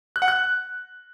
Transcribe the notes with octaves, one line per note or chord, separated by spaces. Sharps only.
F#6
F#5
F#6